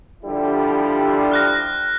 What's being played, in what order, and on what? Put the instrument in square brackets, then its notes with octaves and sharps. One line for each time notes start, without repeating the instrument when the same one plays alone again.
[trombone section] D3 F3 G3 [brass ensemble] E4 G4
[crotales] F6 F#6 A#6